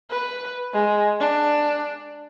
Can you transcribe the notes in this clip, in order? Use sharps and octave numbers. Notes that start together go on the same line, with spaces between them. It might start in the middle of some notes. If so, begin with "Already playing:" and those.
B4
G#3
D4